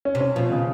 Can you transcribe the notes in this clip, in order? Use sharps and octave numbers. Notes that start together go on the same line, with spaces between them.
C#4
C3
C#4
B2 F3
C#3